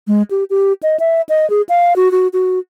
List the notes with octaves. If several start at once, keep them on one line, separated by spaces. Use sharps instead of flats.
G#3
G4
G4
D#5
E5
D#5
G#4
F5
F#4
F#4
F#4